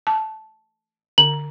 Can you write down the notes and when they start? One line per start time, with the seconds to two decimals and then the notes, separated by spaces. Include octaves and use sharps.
0.07 A5
1.18 D3 F#7